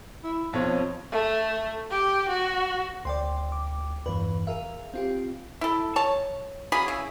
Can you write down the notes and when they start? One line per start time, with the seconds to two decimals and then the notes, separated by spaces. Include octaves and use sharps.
0.24 E4
0.53 B1 F2 F3 C#5
1.12 A3
1.91 G4
2.29 F#4
3.05 D2 D5 G5 C6
3.52 D6
4.06 E2 G2 E3 B4
4.47 G#4 A#4 E5 F5
4.94 C4 F4 G4
5.61 E4 A4
5.96 C#5 A5
6.72 C#3 F#3 G#4 B5
6.88 C#3 E4